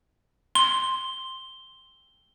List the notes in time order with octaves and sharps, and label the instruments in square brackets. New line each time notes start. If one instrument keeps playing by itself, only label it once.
[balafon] C6 [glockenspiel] G7